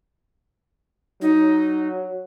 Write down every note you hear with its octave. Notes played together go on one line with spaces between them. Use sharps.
F#3 D#4